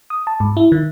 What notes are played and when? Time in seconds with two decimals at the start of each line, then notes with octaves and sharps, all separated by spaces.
0.10 D#6
0.27 A5
0.40 G#2
0.57 E4
0.72 D#3